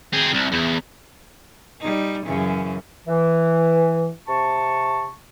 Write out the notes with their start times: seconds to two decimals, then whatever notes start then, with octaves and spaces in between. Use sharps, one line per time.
0.13 C4 G#4
0.33 C2
0.52 E2
1.80 G3 D#4
2.25 F#2 C#3 E3
3.07 E3
4.28 C3 A5 C#6